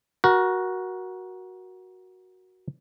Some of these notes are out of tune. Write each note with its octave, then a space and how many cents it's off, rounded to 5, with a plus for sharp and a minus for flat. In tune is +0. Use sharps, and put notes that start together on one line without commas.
F#4 +0 A#4 +25